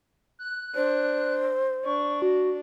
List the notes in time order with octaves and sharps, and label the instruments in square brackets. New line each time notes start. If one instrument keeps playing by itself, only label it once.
[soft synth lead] F#6
[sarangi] D4 [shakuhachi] C5
[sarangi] D4 [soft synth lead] C#6
[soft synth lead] F#4